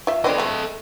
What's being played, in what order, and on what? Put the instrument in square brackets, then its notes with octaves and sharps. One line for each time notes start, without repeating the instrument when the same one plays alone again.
[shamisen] F4 E5
[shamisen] B3 C4 D4 [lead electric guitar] A4 D#5
[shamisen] G#3 A3